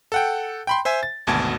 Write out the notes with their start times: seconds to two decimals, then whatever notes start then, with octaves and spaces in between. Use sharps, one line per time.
0.12 A4 F#5 G5
0.67 G5 B5 C6
0.85 C5 E5 G#5
1.03 A6
1.27 G#1 D2 B2 A5 G#6